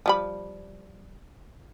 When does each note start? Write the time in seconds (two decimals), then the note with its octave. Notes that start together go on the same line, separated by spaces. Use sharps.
0.06 F3 G3 B5